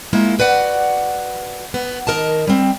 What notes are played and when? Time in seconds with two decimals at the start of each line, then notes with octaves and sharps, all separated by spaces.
0.13 G#3 A#3 E4 F4
0.39 F#4 B4 D5 F#5
1.74 B3
2.07 D#3 A#4 D#5 A5
2.47 G3 C4